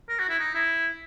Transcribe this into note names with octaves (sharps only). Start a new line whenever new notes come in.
A#4
F#4
E4
D#4
E4